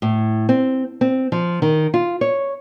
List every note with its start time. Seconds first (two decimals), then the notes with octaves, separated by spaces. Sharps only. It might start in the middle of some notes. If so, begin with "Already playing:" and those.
0.02 A2
0.49 C4
1.01 C4
1.32 F3
1.62 D#3
1.94 F4
2.21 C#5